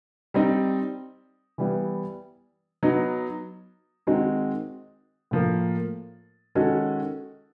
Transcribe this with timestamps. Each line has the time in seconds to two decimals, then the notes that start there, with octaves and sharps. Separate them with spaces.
0.34 G3 C4 D#4
1.58 E3 G3 B3 E4
2.83 F#3 B3 D#4
4.07 D#3 G#3 C4 D#4 F#4
5.31 A2 F3 A#3
6.55 D#3 G#3 C#4 F#4 A4